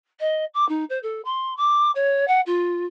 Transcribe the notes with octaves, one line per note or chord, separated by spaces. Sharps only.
D#5
D6
D#4
C5
A4
C6
D6
C#5
F#5
F4